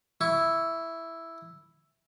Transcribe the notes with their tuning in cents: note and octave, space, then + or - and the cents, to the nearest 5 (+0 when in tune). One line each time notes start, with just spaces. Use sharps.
E4 +0 C#6 +15